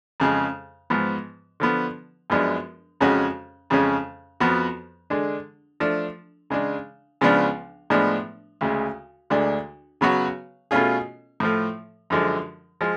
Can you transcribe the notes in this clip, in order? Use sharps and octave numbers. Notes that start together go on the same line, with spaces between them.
F2 C#3 G#3
G#2 F3 B3
D3 F3 B3
F#2 F3 G#3 B3 D4
F2 C#3 G#3 C#4 F#4
F2 C#3 G#3 C#4
F2 F3 B3 F#4
D3 G#3 D4
F3 A3 D4
C#3 G#3 D4
C#2 C#3 F3 B3 D4
A2 F3 G#3 B3 D4
D2 C#3 G#3
D2 D3 G#3 D4
C#3 F#3 B3 F#4 C#5
B2 A3 C#4 F4 G#4
A2 F3 A3
F#2 D3 F3 G#3
F3 G#3